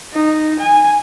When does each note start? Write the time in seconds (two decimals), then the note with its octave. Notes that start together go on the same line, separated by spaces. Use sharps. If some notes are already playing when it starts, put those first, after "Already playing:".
0.13 D#4
0.59 G#5